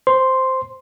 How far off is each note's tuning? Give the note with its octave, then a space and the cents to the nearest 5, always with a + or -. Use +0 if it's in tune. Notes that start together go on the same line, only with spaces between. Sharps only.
C5 -5 C6 +0